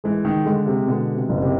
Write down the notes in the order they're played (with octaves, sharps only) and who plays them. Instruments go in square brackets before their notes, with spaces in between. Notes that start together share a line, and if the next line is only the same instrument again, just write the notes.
[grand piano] E3 [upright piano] G#3
[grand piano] D#3
[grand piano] D3 [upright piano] G#3
[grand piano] C3
[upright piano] B2 [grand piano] D3
[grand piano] C3
[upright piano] F#1
[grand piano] C3